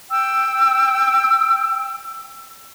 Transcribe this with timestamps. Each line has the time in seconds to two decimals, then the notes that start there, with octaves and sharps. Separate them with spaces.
0.10 G5 E6